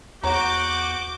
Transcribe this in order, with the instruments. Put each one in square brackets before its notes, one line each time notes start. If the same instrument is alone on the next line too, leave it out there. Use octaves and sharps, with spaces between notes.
[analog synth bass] E2 [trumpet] F#4 [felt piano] C#5 F#5 A#5 [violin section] D6 G6